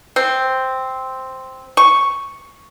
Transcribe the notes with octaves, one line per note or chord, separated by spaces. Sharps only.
C4
C#6